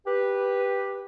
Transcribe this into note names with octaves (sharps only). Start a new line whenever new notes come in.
G4 B4